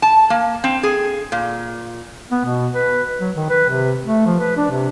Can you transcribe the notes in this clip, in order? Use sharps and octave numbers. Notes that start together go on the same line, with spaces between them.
A5
A#3
C4
G#4
A#2
B3
B2
B4
F#3
D#3
B4
C3
A3
F3
B4
D4
C3